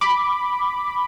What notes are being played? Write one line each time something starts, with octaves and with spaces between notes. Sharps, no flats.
B5 D6